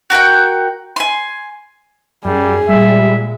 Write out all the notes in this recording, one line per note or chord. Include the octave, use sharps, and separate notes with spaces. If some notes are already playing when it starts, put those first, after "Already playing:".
F#4 A#4 F#5 G5
G#5 C6
F#2 G3 G#4
A#2 G3 G#3 E5